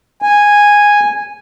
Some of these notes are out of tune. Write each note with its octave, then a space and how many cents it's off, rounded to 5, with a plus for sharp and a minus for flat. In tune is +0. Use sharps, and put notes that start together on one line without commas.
G#5 -10